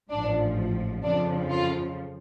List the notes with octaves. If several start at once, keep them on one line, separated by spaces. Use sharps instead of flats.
A1 G#2 F3 D4
F2 C#3 F3 D4
F4